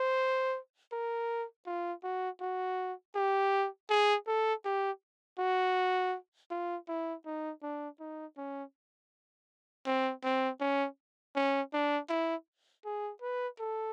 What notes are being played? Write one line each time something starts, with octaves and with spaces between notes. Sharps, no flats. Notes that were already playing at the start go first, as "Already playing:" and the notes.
Already playing: C5
A#4
F4
F#4
F#4
G4
G#4
A4
G4
F#4
F4
E4
D#4
D4
D#4
C#4
C4
C4
C#4
C#4
D4
E4
G#4
B4
A4